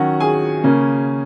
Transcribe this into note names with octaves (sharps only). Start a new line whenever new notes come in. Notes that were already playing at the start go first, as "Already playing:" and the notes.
Already playing: D#3 F#3 C#4 F#4 F#5
G#4 G#5
C#3 A#3 C#4